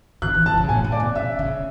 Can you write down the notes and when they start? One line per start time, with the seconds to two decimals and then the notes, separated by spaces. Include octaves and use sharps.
0.22 D3 F#6
0.34 E3
0.46 E3 A5
0.57 C#3
0.69 A2 G#5
0.84 A2
0.92 D5
1.00 B2
1.15 C#3 E5
1.39 C#3